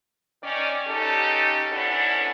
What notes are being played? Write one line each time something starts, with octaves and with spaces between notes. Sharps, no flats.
D#3 C#4 D5
C#3 C#4 D#4 G4 A4
G#2 B3 C#4 D4 E4 A4